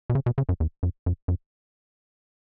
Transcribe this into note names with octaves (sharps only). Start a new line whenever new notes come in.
B2
C#3
B2
C#3
F#2
E2
F#2
F#2
F#2